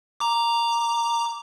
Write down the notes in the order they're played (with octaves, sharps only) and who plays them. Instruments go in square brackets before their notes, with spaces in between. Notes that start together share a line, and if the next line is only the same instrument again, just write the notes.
[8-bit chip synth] A#5 D6